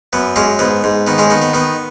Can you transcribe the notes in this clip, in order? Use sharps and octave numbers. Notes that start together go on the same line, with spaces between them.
F#2 B3
F#2 G#3 C#4
G#2 B3
G#2
D#3 B3
G#3 C#4
D#3 B3
B3
D#3 B3